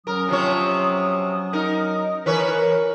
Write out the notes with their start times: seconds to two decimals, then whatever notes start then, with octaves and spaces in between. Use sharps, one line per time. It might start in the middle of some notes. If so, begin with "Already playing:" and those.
0.07 F#3 C#4 A#4 D#6
0.28 C3 F3 C#5
1.53 D#4 A#4
2.26 E3 A#4 B4 C#5